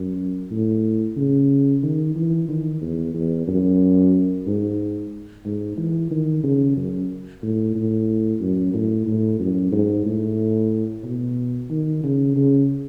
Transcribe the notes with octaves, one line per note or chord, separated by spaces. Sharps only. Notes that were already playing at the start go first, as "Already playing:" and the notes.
Already playing: F#2
A2
C#3
D#3
E3
D#3
E2
E2
F#2
G#2
G#2
E3
D#3
C#3
F#2
A2
A2
F#2
A2
A2
F#2
G#2
A2
B2
D#3
C#3
C#3